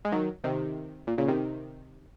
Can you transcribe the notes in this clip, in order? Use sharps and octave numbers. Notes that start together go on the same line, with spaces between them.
G#3
D#3 F#3
C3 D#3
A#2
A#2 C#3
C3 D#3